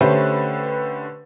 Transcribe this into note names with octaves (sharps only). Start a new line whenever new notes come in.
D3 A3 C#4 G4 B4 C5